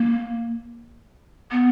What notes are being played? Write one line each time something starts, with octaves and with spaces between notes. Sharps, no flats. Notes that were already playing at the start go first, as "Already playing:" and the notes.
Already playing: A#3
B3